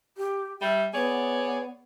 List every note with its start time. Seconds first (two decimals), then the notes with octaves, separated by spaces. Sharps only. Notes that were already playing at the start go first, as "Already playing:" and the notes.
0.17 G4
0.62 G3 E5
0.94 B3 G#4 C#5 D5